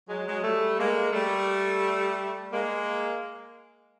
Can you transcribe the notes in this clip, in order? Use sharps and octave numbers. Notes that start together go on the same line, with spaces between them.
F#3 G#3
F#3 G#3
G3 A3
G#3 A#3
G3 A3
G#3 A#3